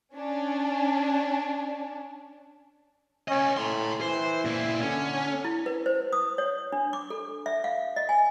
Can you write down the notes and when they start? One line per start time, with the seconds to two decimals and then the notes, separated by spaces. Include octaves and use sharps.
0.14 C#4 D4
3.28 C#4 C#5 D#5
3.57 A2 A#5 C6
4.01 E3 C5
4.45 A#2 E4
4.81 D3 C#4
5.45 E4
5.66 B4
5.86 C5
6.13 D#6
6.38 C#5
6.72 D4
6.93 D6
7.10 A4
7.46 E5
7.64 F5
7.96 D#5
8.09 G#5